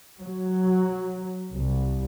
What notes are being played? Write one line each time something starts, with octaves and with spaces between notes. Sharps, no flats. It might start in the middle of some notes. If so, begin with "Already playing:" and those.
F#3
C2